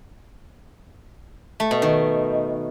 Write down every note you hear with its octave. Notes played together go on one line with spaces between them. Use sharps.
A3
B2
D#3